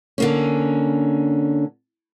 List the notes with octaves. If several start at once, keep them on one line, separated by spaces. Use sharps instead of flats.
D3 A#3 C#4